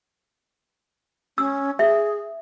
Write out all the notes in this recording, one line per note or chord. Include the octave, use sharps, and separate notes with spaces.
C#4 E6
G#4 E5